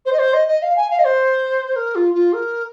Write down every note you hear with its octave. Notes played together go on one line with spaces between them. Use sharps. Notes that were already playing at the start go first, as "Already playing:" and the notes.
C5
D#5
C5
D#5
D#5
F5
G#5
F5
D#5
C5
A#4
F4
F4
A#4